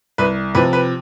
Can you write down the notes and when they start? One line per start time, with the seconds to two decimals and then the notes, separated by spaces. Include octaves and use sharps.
0.18 C2 B4
0.55 C3 F3 B4
0.73 B4